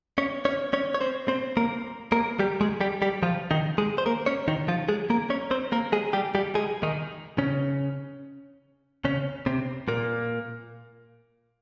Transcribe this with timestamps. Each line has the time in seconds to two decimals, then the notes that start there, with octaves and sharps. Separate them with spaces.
0.18 C#4 C#5
0.45 C#4 C#5
0.73 C#4 C#5
0.94 C#5
1.01 C4 C5
1.28 C4 C5
1.57 A#3 A#4
2.12 A#3 A#4
2.39 G3 G4
2.61 G#3 G#4
2.81 G3 G4
3.02 G3 G4
3.23 F3 F4
3.51 D#3 D#4
3.78 G#3 G#4
3.98 C5
4.06 A#3 A#4
4.26 C#4 C#5
4.48 D#3 D#4
4.68 F3 F4
4.89 G#3 G#4
5.10 A#3 A#4
5.30 C#4 C#5
5.51 C4 C5
5.72 A#3 A#4
5.92 G#3 G#4
6.13 G3 G4
6.35 G3 G4
6.55 G#3 G#4
6.83 D#3 D#4
7.38 C#3 C#4
9.05 C#3 C#4
9.46 C3 C4
9.88 A#2 A#3